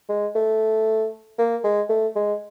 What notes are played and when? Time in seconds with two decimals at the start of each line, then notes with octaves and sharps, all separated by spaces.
0.09 G#3
0.35 A3
1.38 A#3
1.64 G#3
1.89 A3
2.16 G#3